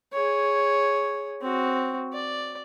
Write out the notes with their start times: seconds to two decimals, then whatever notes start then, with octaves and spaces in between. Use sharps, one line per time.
0.13 G#4 C#5
1.41 C4 F#4
2.13 D5